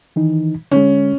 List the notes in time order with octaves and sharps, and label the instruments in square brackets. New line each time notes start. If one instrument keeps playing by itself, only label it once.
[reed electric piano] D#3 E3 D#4
[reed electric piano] D3 G#3 [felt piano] C#4